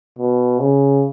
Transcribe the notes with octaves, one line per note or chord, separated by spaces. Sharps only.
B2
C#3